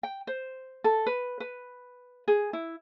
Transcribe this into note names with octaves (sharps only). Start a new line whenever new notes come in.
G5
C5
A4
B4
B4
G#4
E4